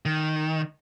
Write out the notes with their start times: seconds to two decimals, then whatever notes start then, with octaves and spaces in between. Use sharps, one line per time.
0.06 D#3